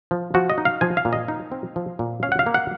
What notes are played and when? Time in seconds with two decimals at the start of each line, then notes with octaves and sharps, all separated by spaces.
0.11 F3
0.34 F3 F#4
0.50 D#5
0.58 D#4
0.65 F5
0.81 F3 G#5
0.97 F5
1.05 A#2
1.13 D#5
1.28 D#4
1.52 C4
1.76 F3
1.99 A#2
2.23 C#4 F5
2.32 F#5
2.39 F5
2.46 A#3
2.54 F#5